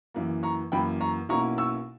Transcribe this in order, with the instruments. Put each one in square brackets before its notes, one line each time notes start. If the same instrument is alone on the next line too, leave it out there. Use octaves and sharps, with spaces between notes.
[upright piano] F#2 E3 A#3
A#5 C#6
F#2 E3 A#3 G5 B5
A#5 C#6
B1 B2 A#3 C#4 E4 A#5 C#6
C#6 E6